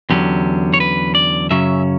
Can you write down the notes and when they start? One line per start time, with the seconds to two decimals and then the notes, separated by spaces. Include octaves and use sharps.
0.10 E2 D3 F#3 C#4 G4
0.74 C#5
0.80 B4
1.15 D5
1.50 F#2 C#3 F#3 C#4 E5